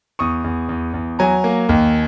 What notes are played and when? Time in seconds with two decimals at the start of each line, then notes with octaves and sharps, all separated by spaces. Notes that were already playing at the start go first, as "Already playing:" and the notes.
0.19 E2 C#6 D#6
0.44 E2
0.69 E2
0.94 E2
1.19 F#3 G#5 A#5
1.44 A#3
1.69 D#2